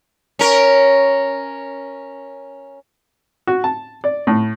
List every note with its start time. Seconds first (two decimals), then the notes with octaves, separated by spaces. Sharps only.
0.39 C#4 A#4
3.47 F#4
3.64 A5
4.04 D5
4.27 A2